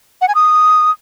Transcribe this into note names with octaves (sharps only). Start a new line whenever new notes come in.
F#5
G#5
D#6